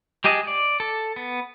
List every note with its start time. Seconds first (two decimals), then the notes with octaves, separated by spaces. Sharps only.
0.24 G#3 G4 G#4 D#5 A5
0.47 D5
0.80 A4
1.16 B3